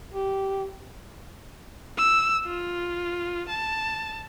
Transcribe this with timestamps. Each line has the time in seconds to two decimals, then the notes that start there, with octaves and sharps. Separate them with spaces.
0.14 G4
1.98 E6
2.45 F4
3.48 A5